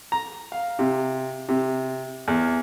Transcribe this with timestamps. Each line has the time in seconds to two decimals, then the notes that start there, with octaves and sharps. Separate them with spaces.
0.12 A#5
0.52 F5
0.79 C3
1.49 C3
2.28 E2